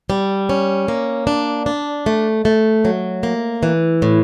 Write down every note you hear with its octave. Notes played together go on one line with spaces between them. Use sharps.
G3
C#4
A#3
D4
D4
A3
A3
F#3
A#3
E3
A2